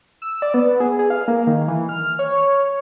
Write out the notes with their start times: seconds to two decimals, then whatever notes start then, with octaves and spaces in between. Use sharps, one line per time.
0.22 E6
0.42 D5
0.54 B3
0.80 G#4
0.99 G#4
1.10 F5
1.28 A#3
1.47 D#3
1.68 E3
1.89 F6
2.19 C#5